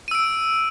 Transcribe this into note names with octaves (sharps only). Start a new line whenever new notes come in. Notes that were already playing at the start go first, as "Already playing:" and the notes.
E6 D7 D#7